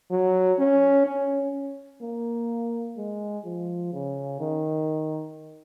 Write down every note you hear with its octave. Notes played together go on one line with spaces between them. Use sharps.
F#3
C#4
C#4
A#3
G#3
F3
C#3
D#3